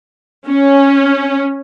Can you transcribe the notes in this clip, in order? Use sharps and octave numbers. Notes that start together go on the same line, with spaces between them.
C#4